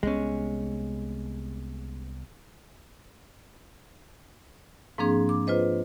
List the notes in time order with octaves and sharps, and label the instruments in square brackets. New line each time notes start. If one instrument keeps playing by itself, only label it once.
[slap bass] C2 C3 B3 [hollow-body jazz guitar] G#3 C#4
[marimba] G#2 F3 A#3 C4 D4 G#4
D6
F4 B4 C5 D#5